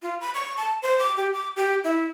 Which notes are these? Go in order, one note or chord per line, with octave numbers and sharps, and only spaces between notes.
F4
B5
C#6
A5
C5
D6
G4
D6
G4
E4